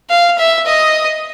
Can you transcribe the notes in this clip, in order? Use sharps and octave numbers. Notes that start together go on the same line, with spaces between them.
F5
E5
D#5